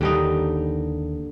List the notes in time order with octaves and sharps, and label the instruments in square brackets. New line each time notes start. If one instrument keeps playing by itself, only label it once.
[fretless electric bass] D#2 [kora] D3 G3 D#4